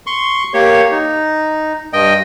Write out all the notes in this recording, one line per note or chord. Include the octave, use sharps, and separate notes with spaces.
C6 C#6
A#3 G4 C#5
D#4
G2 D#5 G5